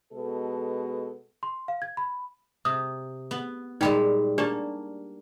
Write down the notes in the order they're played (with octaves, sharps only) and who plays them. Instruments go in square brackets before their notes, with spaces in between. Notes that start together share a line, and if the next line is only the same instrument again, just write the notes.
[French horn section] B2 G#3 A4
[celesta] C6
F5
G#6
B5
[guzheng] C3 [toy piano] D#6
[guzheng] B3
[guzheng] A#2 G3 G#3 [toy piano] D#4 G5 B5
[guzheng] A#3 A5 [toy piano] D4 G4 D5